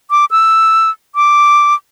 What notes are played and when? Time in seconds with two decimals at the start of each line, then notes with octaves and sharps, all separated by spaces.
0.11 D6
0.31 E6
1.15 D6